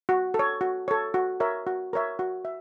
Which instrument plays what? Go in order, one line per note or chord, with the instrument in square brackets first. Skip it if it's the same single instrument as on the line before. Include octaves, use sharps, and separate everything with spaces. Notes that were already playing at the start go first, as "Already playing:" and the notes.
[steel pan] F#4
A4
C#5
F#4
A4 C#5
F#4
A#4 C#5 E5
F#4
A#4 C#5 E5
F#4
E5